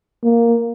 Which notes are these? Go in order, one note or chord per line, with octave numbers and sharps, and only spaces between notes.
A#3